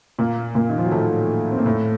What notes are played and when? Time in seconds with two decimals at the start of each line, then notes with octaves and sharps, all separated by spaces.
0.19 A#2 A#3
0.55 A#2 A#3
0.70 D#3
0.78 F3
0.85 F#3
0.91 A2 A3
1.51 C4
1.58 A#3
1.65 A2 A3